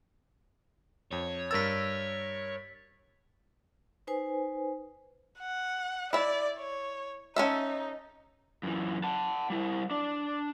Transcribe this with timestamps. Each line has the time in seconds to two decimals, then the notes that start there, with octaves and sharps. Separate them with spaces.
1.12 F2 C#5
1.51 G2 A#4 E6 A6 B6
4.07 D#4 B4 C5 G#5
5.40 F#5
6.13 E4 D5 E5
6.58 C#5
7.36 C#4 D#4 A4 E5
8.63 F#2 E3
9.04 F#5 A5
9.50 G3 E4
9.91 D4 D5